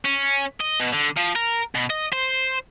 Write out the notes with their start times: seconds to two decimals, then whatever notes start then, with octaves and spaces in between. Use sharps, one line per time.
0.05 C#4
0.61 D#5
0.80 B2
0.93 D3
1.17 F3
1.36 A#4
1.75 B2
1.90 D#5
2.13 C5